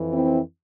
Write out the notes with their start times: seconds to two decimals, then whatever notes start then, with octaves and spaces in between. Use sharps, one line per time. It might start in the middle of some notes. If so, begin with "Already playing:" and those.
Already playing: F2 E3
0.13 C4 E4